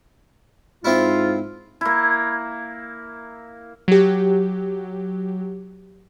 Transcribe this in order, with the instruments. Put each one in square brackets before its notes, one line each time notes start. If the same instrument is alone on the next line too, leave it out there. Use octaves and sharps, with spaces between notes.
[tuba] G#2 [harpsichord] C4 E4 [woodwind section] F4
[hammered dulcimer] A#3 E4
[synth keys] F#3 G4